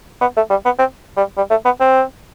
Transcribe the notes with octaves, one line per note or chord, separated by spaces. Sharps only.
B3
A3
G3
B3
C4
G3
G3
A3
B3
C4